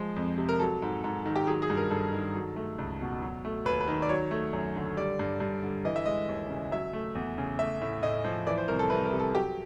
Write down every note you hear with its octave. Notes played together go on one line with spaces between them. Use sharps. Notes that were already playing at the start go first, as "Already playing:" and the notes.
Already playing: F3 G#3
F2
C3
A#4
F#3 A4
G#2
G#2
D#3
G4
F#3 G#4
G#4
G2
A#4
G2 A4
D#3
F#3
A3
C#2
B2
F#3
A3
D#2 B4
B4
D#3
D5
F#3 C#5
A3
F#2
D3
G3 D5
G2
G2
D3
E3 D#5
E5
G#3 D#5
D#2
C#3
F#3 E5
A3
E2
C#3
A3 E5
A2
A2 D#5
F3
E3 D5
C5
C2 A#4
A4
C2 B4
A#4
C3
A4
F#3 G4